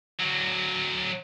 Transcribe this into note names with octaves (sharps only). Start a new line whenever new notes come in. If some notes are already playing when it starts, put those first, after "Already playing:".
D3 F#3